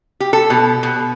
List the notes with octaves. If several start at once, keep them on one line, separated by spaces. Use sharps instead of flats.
G4
A4
B2
B2